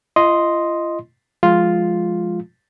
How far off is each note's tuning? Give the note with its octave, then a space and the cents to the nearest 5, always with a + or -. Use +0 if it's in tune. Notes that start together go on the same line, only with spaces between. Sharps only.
F4 -40 D#5 +0 C6 +0
F3 +0 G#3 +0 F4 +0